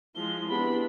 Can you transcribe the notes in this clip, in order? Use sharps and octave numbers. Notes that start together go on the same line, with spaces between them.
F3 G#3 E4 G7
B3 C4 D4 E4 G4 G#4 B5